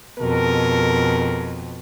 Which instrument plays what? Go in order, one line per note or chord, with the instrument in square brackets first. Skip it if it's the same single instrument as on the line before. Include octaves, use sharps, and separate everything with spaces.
[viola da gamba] F2 B2 [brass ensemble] G#3 A4 A#4